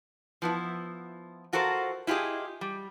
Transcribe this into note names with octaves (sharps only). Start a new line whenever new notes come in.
F3 B3 E4
F4 F#4 A4 A#4 C5
E4 F4 G4 G#4 D#5
G3